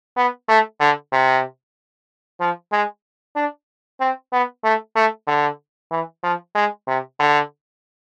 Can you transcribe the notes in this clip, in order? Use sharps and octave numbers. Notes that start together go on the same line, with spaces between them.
B3
A3
D3
C3
F3
G#3
D4
C4
B3
A3
A3
D3
E3
F3
G#3
C3
D3